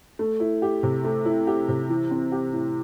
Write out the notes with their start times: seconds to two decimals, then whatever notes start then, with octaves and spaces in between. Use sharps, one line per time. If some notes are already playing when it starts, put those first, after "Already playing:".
0.19 A3
0.40 E4
0.62 G4
0.83 C3
1.05 A3
1.25 E4
1.47 G4
1.68 C3
1.89 E3
2.11 C4
2.32 G4
2.53 A2